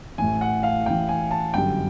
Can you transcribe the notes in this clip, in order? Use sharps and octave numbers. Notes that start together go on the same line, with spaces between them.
A1 A2 E3 G#5
F#5
F5
A1 A2 E3 G5
G#5
A5
G1 F#2 D3 G3 G5